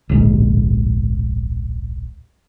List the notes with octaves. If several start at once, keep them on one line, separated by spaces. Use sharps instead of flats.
D1 A#1 G#2